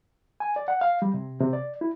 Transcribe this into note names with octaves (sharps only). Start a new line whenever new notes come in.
G#5
D5
F#5
F5
G3
C3
C3
D5
E4